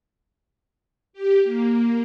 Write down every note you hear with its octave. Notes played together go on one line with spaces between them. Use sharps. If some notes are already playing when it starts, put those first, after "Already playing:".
G4
A#3